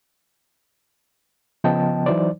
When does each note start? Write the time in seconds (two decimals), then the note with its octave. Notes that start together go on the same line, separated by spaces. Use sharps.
1.64 C#3 F3 B3 D#5 G5 A5
2.06 E3 F#3 D#4 C5 D5